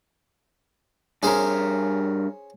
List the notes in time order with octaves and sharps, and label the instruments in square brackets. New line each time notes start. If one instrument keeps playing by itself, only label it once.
[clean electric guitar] G2 A#4 [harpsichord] C#4 G#4 C5